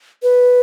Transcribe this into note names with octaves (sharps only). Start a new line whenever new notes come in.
B4